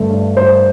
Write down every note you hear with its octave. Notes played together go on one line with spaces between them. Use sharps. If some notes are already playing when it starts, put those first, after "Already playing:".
Already playing: G2 D3 A3
G2
G2 C5